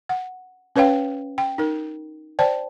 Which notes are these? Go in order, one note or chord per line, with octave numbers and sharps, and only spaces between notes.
F#5
C#4 B4 C#5 F5 G5
G5
D#4 A#4
C5 D5 G5 A5